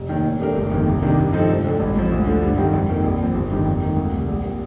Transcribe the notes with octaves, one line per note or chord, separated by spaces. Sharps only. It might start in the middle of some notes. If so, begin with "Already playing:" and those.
Already playing: F1
D#2 D#3
A#2
A3 D4 G4 A#4
G1
F2 D#3 A#3
C2
C3 D#3 A#3 D4
G2
F3 C4 D#4 A4
F1
F2 D3
A1
A2 F3
D2
D3 F3
G2
D#3 G3 C4
F2
D#3 A#3
A#1
A#2 F3 C4
G1
G2 D#3
F2
D#3 A#3
D2
C3 G3
A#1
A#2 G3 A#3